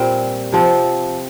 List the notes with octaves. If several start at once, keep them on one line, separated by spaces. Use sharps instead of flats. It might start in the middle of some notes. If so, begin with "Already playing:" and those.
Already playing: A#2 G3 C4
C3 F3 C4